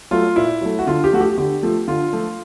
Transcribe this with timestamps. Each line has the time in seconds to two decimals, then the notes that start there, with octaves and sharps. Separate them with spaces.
0.11 F#3 A3 F4
0.36 A#2 E4
0.61 F#3 A3
0.79 F#4
0.87 D3 F4
1.04 G4
1.12 F3 A3 F#4
1.21 G4
1.37 D3 G4
1.63 F3 A3
1.88 D3 F4
2.13 F3 A3